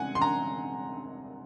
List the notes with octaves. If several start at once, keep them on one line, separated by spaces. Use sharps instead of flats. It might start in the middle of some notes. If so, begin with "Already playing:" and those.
Already playing: C3 G#3 F#5 G#5
C6
A#5